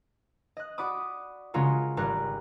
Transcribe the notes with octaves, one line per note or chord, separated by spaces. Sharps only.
D#5 F#6
F#4 D5 B5 D6 D#6
C#3 G#3 F4 F#4 A#4
G#1 G3 A#4 F#6 A#6